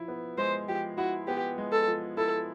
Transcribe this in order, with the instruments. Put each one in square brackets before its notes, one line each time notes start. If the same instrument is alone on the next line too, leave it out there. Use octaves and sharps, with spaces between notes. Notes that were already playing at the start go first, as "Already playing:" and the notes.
Already playing: [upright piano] F3 E4
B3
[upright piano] G#3 [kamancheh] C5
[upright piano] F3 [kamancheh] G4
[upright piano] E4 [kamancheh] F#4
[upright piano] B3 [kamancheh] G4
[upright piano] G#3
[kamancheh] A4
[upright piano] F3
[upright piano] E4 [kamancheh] A4